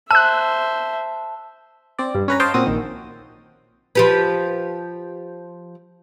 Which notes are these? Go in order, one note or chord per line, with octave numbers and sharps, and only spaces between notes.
C5 E5 A5 E6 F#6
C4 D5
G2
C#4 B4 A#5
C5 C#5 D#5 F5 G5 A5
A#2 C4 F#4 D#6
A#1 D#3
F3 G4 B4